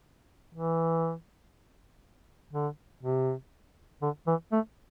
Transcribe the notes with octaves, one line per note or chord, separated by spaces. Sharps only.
E3
D3
C3
D3
E3
A3